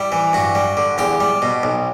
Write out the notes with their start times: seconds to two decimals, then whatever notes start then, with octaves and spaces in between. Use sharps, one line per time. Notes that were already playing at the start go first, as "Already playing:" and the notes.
Already playing: G3 E4
0.12 E3
0.33 G2 F#4
0.55 G3
0.77 D3
0.98 E2 G4
1.20 G3
1.42 B2
1.63 B1